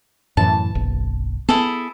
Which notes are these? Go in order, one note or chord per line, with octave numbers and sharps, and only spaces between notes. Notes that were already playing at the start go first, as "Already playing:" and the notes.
F#2 A2 E3 A5
F#1 B1
B3 E4 G#4 A4